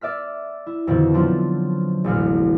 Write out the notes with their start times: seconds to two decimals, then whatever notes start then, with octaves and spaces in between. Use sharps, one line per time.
0.01 D5 E5 F6 B6
0.66 E4
0.87 F2 B2 D3 D#3 C4
1.14 F3 F#3 D4 F4
2.04 E1 A1 B2 F6